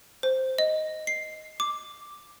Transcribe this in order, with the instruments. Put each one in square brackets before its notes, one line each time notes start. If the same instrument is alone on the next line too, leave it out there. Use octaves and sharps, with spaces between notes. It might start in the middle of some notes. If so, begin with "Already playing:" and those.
[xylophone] C5
D#5
C7
D6